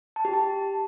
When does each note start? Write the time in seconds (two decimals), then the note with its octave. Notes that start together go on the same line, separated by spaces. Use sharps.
0.16 A5
0.25 G4
0.33 A5